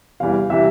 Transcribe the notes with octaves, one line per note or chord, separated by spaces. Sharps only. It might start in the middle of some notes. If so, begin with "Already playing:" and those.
E2 C3 E3 G3 F5
C3 E3 G3 E5